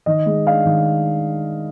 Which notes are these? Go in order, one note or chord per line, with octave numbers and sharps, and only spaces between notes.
D#3 D#5
G#3
D4 F5
D#3